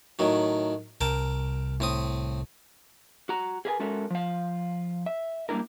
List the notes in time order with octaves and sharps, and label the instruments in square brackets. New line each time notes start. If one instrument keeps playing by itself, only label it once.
[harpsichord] A2 D#3 F#3
[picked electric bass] C2 [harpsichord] A#4 G5 A5
[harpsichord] A2 C4 D#6
[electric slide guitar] F#4 A#5
G#4 A#4 B4 F5 G#5
G#3 C#4 F#4 A4 A#4 E5
F3 F5
E5
G3 A#3 B3 D4 E4 A#4